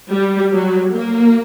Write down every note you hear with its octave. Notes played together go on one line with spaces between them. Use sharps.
G3
F#3
A#3